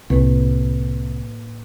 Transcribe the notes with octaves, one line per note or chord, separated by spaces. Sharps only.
C2 A2 A#3 B4